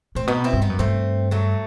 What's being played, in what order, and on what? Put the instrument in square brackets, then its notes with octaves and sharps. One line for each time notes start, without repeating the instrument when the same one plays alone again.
[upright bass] A2 [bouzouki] C4
[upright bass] B2 [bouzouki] B3 D#4
[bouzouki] C4 E4
[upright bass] G2
[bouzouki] B3 D#4
[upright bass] F#2
[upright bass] G2 [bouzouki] A3 C4
[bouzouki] F#3 A3